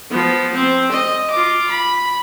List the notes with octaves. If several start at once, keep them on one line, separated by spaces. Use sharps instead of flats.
F3 B3
C4
D#5
F4 D6
B5